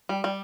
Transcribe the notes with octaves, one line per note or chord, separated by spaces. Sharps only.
G3
G3